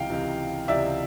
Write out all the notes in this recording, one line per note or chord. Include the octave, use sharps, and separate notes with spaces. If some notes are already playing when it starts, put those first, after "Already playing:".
Already playing: C#2 C3 E3 F5 G5
C#2 C3 E3
C#2 C3 E3 D5 E5